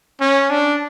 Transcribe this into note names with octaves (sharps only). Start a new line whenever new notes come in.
C#4
D4